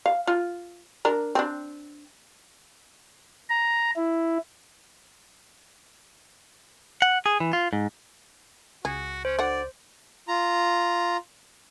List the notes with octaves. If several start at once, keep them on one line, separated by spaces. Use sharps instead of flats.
F5
F4
D4 A#4
C4 D4
A#5
E4
F#5
G#4
E3
F4
G#2
C#2 F#4 G#4
C#4 C5
D3 F#4 D5 F#5
F4 A#5